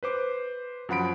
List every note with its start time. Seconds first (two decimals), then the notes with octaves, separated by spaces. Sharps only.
0.03 B4 C5 D6
0.89 F#2 F3 F#5 B5 D7